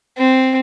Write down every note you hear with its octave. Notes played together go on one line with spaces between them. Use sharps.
C4